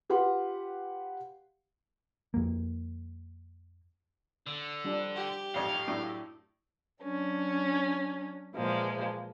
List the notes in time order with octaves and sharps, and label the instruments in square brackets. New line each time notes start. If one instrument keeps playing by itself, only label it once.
[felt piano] F4 G4 B4 F5 F#5 C6
[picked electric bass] F2 A#3
[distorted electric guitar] D3 [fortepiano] E6
[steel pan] F3 G3 D4
[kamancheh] G4
[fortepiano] A1 F2 G#2 [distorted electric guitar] F5
[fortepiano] F#2 A2 A3 [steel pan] D4 E4
[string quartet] F#3 C#4 D4
A#2 E3 F3 G#3 A#3